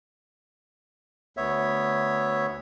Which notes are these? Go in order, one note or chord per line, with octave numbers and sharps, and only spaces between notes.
D2 B3 C#5 E5